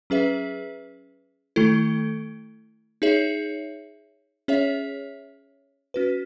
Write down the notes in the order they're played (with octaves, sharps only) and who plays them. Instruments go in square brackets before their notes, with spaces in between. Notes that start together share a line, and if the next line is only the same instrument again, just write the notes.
[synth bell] F#3 C#4 G#4 B4 E5
D#3 A3 E4 A4
D#4 G#4 C#5 E5
C#4 G#4 C#5 E5
C#4 F#4 B4